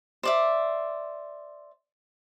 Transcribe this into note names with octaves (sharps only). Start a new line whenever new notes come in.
C5 D5 E5